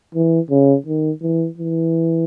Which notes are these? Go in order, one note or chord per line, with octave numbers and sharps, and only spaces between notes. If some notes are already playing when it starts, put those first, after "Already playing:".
E3
C#3
D#3
E3
E3